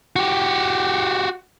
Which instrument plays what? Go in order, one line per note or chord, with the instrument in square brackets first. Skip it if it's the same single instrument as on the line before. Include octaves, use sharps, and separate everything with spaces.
[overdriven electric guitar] F#4 G4